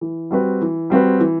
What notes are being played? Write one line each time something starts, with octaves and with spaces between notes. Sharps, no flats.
E3
G3 C4 F#4 B4
E3
G3 C4 F#4 B4
E3